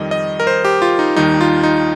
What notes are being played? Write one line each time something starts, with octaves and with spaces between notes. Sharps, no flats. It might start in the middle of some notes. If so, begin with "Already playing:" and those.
Already playing: F2 D#3 G3 D#5
D#5
A#4
C5
G4
F4
D#4
D#2 D#3 G3 D#4
F4
D#4